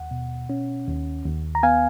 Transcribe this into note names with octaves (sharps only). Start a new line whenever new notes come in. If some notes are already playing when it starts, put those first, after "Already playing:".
Already playing: D#2 F#5
B2
C#4
D#2
D#2
A#5
B3 F5 G#5